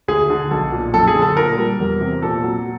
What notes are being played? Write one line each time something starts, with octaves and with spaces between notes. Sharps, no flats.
D2 G#4
D3
B1 A4
A#2
F#2 A4
G#4
D3
A4
A#2 A#4
G3
E2
C3
A#2 A4
F#3